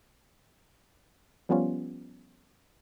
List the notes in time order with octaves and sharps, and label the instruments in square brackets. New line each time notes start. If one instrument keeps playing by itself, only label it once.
[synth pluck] F3 G3 B3 C#4 F4